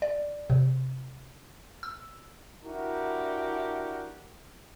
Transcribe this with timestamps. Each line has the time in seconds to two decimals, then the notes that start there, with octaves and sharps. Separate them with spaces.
0.02 D5
0.50 C3
1.83 E6
2.64 D4 E4 F#4 G4 A#4